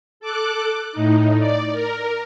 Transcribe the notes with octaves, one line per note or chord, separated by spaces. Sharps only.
A4 D6 F#6
A2 D#4
D5
A#4